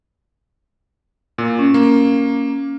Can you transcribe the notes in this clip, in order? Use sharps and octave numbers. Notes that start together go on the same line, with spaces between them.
A#2
C#4
A#3